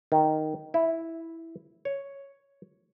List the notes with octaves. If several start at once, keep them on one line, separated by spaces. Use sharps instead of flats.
D#3
E4
C#5